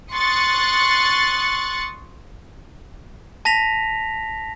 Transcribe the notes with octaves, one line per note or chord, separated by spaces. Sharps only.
C6 C#6 D#6 F#6 A6 C#7
A5 A#6 B6 F7